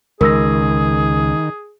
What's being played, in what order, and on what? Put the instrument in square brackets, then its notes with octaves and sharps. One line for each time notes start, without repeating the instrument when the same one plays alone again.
[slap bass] C#2 [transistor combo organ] D#3 [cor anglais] G#4 [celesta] A#4 E6 A#6